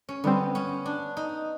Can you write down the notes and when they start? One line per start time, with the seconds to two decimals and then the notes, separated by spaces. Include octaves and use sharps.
0.09 C#4
0.24 D3 G3 B3 C4
0.55 C#4
0.86 D4
1.17 D#4